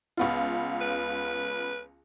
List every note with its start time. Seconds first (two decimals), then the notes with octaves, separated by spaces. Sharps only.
0.17 C#2 B3 F4
0.81 B4